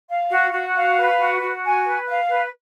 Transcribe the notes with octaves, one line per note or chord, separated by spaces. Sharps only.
F5
F#4
F#4
F5
B4
F#4
F#4
G#5
B4
F5
B4